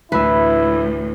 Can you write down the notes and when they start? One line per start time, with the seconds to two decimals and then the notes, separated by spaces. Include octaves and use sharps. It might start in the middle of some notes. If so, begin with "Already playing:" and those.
0.12 D2 A2 E3 E4 B4 E5